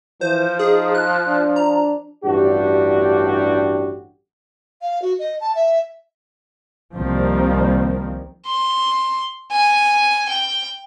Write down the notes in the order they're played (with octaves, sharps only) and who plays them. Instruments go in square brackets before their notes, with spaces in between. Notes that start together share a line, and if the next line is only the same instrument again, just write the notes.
[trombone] E3 [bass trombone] F3 [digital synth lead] C5
[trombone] D#4 [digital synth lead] G#4
[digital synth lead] F#6
[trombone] D4
[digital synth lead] A#5
[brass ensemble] A1 G2 D4 F#4 G4
[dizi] F5
F#4
D#5
A5
E5
[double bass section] C2 D#3 F3 G3 A#3 C4
[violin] C6
G#5
G5